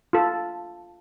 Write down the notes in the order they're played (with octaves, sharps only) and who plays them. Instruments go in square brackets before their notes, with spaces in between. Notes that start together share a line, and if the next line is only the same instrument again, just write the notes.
[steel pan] F4 A4